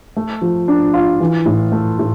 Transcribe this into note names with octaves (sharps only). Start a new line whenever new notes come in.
A3
F3
D4
F4
E3
A2
A3
A2